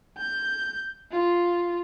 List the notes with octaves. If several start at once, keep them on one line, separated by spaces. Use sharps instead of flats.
G6
F4